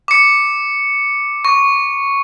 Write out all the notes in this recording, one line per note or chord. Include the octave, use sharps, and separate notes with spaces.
D6 C#7
C#6